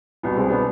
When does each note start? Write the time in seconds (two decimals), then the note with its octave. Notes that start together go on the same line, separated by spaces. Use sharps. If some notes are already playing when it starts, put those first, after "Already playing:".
0.23 C2 B2 B3
0.36 G#3 C4
0.49 B3 D4